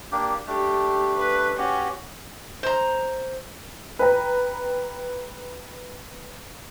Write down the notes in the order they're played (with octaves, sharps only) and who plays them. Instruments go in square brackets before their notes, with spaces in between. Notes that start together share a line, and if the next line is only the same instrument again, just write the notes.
[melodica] A#3 D4 G4
[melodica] A3 D4 [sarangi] G4
[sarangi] B4
[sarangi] C#4 [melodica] F#4 G4 C#6
[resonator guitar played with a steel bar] C5 A#5
[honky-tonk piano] B4 G5 A#5